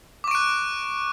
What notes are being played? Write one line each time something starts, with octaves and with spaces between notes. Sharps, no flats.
C#6 D6 F#6 D7